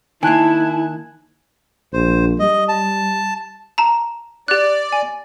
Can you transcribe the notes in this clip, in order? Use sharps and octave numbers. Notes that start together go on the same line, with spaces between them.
D#3 A#3 E4 G#5 A5 F#6 G#6
A#1 C5
G3 D#5
A5
A5 A#5
G4 D5 F#6
G#5